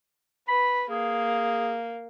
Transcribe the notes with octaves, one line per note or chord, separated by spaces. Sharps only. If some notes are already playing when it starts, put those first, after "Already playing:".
B4 B5
A#3 G#4